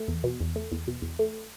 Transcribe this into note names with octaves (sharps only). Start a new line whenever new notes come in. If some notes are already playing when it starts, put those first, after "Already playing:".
Already playing: A3
E2
B2
E2
A3
E2
B2
E2
A3